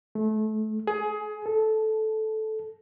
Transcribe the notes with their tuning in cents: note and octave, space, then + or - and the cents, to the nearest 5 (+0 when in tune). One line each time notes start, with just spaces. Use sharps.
A3 -25
G#4 +20
A4 -10